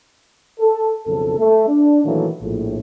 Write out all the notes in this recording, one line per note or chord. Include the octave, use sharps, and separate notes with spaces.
A4
B1 F2 C#3 A4
A3
D4
A#2 D#3 E3 F#3 A3 A#3
A#1 A2